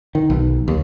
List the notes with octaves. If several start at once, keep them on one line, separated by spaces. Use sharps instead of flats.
D#3
B1
D#2